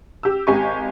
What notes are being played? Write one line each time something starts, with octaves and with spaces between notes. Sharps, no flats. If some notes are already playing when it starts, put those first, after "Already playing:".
G4 E6
G#1 G4 D#5 G#5 C#6